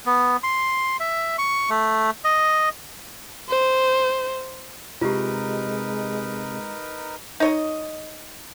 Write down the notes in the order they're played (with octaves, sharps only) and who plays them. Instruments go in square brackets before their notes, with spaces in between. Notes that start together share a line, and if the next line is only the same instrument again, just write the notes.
[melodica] B3
C6
E5
C#6
A3
D#5
[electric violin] C5
[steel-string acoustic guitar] C3 [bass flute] G#3 [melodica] D#4 A#4 B4 [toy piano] F4 G4
[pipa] D#4 C#5 D#5